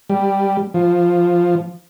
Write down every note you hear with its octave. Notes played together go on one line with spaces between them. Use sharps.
G3
F3